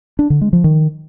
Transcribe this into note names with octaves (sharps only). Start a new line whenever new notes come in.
D4
D3
G#3
F3
D#3